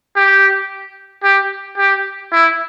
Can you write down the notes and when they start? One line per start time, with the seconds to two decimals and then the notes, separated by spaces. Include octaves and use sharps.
0.16 G4
1.24 G4
1.77 G4
2.31 E4